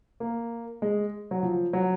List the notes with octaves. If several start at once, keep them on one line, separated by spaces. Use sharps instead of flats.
A#3
G#3
F#3
F3
F#3